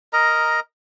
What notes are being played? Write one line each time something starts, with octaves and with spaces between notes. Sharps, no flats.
A#4 D#5 A#5